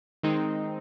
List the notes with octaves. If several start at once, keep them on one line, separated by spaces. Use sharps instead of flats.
D#3 G#3 C4 D#4